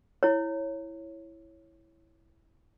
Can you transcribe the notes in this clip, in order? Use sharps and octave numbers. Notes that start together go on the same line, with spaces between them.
E4 C#5